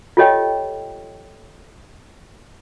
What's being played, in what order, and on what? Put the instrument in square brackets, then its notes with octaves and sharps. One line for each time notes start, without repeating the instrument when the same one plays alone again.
[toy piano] F4 G4 A4 C#5 D#5 G5